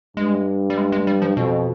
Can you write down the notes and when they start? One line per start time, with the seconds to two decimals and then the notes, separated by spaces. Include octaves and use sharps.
0.17 G2 G#3
0.70 G3
0.77 G#3
0.92 G#3
1.07 G3
1.22 F3
1.37 F2 B2